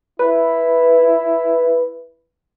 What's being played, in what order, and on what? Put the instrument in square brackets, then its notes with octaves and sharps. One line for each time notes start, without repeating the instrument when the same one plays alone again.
[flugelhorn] E4 [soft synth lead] B4